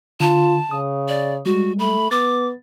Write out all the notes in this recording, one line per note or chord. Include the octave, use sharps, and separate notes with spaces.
D3 F4 A5
C#3 D#6
D5
G3 G#3 F#4
A3 B5
B3 D6 A6